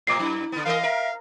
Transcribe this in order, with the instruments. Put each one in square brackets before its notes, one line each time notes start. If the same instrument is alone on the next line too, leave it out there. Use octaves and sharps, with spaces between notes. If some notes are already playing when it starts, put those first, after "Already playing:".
[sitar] A2 C3 [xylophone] D6 C7
[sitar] F#2 [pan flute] E4
[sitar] D3 B3
[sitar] E3 D#5 [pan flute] A#4 [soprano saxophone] F5
[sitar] A#4 [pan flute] E5